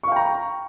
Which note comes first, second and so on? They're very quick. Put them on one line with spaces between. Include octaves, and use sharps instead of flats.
C#6 F5 G5 A#5